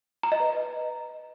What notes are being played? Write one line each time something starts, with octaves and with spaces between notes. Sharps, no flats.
A#5
D#5
B4